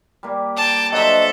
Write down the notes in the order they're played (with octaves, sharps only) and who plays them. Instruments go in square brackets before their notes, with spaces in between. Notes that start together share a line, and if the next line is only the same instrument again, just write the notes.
[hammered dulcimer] G3 A#3
[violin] G5 A5
[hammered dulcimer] F#3 D4 C5 [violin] A4 E5 [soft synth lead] D#5